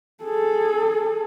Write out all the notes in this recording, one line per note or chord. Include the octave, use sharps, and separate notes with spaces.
G#4 A4